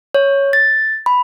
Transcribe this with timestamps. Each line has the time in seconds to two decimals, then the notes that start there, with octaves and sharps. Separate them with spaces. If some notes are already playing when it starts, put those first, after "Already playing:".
0.15 C#5
0.53 A6
1.06 B5